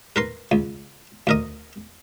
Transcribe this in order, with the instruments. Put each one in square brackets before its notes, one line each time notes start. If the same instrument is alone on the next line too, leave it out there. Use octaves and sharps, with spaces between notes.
[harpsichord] A#4 B4 C6
C#2
D2 A#4 D#5